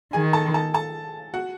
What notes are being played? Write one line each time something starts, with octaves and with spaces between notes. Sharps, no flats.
D#3 G#4 G#5
A4 A5
A4 A5
A4 A5
F#4 F#5